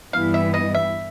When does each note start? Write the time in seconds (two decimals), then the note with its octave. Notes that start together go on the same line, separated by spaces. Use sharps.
0.13 G2 E3 G3 B3 E4 F5
0.34 E5
0.54 D#5
0.74 E5